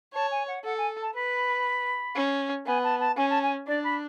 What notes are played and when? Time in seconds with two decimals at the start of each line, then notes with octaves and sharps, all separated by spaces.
0.14 C#5 A5
0.31 G#5
0.47 F#5
0.64 A4 F#5
0.77 G#5
1.02 A5
1.15 B4 B5
2.16 C#4
2.66 B3 G#5
2.84 A5
3.00 A5
3.17 C#4 G#5
3.30 A5
3.43 G#5
3.68 D4 D5
3.84 B5